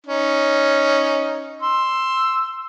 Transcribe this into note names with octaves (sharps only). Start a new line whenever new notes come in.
C#4 D#4
C6 E6